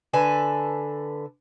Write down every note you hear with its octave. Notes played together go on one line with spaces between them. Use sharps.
D3 A4 B4 G#5